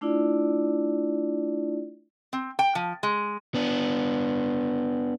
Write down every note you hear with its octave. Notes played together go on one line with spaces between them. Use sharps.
A3 D4 E4 F4 D5
C4
G5
F3
G#3
B3 D4